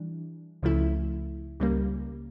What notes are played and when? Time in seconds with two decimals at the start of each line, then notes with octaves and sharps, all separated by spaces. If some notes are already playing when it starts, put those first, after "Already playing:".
Already playing: E3 G3 D4
0.63 C#2 C#3 F3 A3 E4
1.60 C#2 C#3 G3 A#3